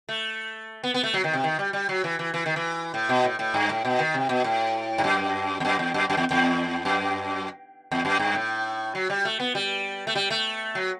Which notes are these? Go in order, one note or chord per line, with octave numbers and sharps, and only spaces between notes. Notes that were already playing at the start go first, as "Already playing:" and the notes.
A3
B3
B3
A3
F#3
D#3
C3
D#3
G3
G3
F#3
E3
E3
E3
D#3
E3
A2
B2
A2
A2
G2
A2
B2
D#3
C3
B2
A2
G2
F#2
E2
F#2
E2
F#2
F#2
E2
E2
F#2
E2
F#2
G2
A2
F#3
G3
A3
B3
G3
A3
G3
A3
F#3